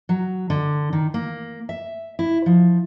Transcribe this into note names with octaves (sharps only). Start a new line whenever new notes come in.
F#3
D3
D#3
A#3
E5
E4
F3